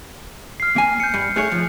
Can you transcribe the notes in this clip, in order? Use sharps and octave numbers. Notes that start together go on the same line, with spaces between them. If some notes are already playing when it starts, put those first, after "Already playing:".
F6 C7
A#3 G#5
G6 C#7
G2
A3 G#4 C#5 F#6 C7 C#7
F3